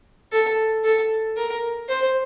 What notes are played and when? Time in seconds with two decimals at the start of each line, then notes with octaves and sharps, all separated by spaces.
0.32 A4
0.84 A4
1.36 A#4
1.89 C5